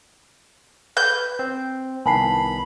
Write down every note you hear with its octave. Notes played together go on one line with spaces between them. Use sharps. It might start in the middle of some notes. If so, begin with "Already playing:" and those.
B4 G6
C4
C2 D#3 B3 G#5 A5 B5 C7